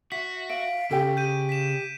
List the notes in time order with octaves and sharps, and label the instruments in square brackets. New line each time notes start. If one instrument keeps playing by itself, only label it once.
[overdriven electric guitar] F#4 [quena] E5 [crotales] B6
[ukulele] E5 [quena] F5 [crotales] D7
[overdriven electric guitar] C#3 [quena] G4 [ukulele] A4 G5
[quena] G4 [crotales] G6 D#7
[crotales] B6 E7